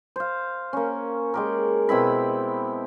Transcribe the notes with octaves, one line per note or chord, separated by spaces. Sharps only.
C5 F5
A#3 C#4
G#3 G4 A#4
B2 C4 E4 B5